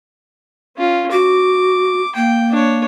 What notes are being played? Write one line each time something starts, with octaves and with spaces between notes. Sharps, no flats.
C#4 F4
F#4 D6
A#3 G5
D4 C#5